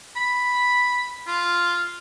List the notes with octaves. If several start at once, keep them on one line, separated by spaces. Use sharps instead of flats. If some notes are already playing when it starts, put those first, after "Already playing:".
B5
F4